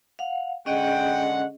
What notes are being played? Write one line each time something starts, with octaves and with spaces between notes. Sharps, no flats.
F5 F#5
D3 G#3 C#4 G#4 D#5 F#5 G5